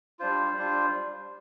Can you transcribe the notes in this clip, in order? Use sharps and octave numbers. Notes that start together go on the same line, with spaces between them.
G3 D4 F4 C5
G3 D4 F4